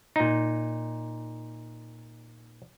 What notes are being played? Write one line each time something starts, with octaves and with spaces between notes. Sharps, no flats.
A#2 D#4